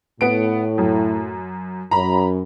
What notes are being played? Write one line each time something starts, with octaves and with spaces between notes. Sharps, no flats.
A2 B3 D7
F#2
F#2 A#5 B5